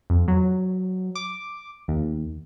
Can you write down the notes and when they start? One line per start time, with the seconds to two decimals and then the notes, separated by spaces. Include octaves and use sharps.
0.10 F2
0.28 F#3
1.15 D6
1.88 D#2